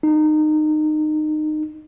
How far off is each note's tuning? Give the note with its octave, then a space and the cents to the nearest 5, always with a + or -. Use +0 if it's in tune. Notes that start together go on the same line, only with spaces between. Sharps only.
D#4 -25